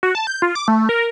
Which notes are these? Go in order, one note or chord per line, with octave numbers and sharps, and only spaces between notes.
F#4
A5
G6
F4
D6
A3
A#4